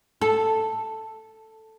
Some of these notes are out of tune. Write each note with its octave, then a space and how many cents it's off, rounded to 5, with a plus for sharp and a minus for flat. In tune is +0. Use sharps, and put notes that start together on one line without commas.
A4 +5